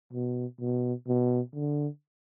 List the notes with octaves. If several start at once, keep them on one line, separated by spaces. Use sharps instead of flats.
B2
B2
B2
D3